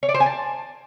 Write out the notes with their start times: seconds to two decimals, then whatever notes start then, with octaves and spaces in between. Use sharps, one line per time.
0.03 C#5
0.09 D5
0.14 C5
0.20 G#5
0.26 A5